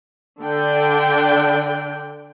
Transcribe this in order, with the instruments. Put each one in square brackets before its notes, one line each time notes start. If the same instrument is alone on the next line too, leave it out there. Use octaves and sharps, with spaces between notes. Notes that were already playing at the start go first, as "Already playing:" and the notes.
[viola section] D3 D4 G5